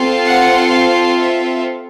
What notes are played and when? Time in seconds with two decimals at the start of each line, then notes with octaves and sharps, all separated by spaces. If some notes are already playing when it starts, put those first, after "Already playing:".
Already playing: C4 F4 A4
0.27 F#5
0.73 F5
1.19 E5